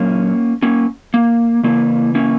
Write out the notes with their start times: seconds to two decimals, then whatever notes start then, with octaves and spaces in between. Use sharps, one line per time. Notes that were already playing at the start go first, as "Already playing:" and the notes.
Already playing: A#2 F#3 A#3 C#4
0.62 A#3 C#4
1.14 A#3
1.63 C#3 E3 A#3
2.15 A#3 C#4